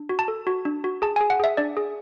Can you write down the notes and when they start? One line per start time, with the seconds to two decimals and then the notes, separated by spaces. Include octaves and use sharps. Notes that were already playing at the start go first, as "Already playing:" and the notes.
Already playing: D4
0.09 F#4
0.19 A5
0.28 A4
0.47 F#4
0.65 D4
0.84 F#4
1.02 G#4 A5
1.16 G#4 G#5
1.30 F#5
1.40 G#4 E5
1.57 D4 D5
1.77 G#4